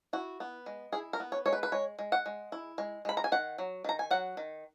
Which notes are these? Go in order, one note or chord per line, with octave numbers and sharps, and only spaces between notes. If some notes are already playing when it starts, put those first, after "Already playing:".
E4 F#4
B3
G#3
E4 G#4
A#4
B3
C#5
G#3 C#5
B4
B4
G#3 C#5
G#3
F#5
G#3
E4
G#3
G#3 B5
A#5
G#5
D#3 F#5
F#3
D#3 A#5
G#5
F#3 F#5
D#3